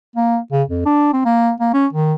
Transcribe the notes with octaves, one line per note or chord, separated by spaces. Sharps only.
A#3
C#3
F2
D4
C4
A#3
A#3
C#4
D#3